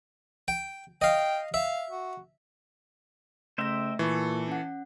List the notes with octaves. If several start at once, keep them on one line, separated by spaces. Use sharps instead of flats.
G5
D#5 F5 G5
E5 F5
F#4
C#3 A3 C5 E5 G5 A#6
A#2 E3 A4 C#6
C#4 F#5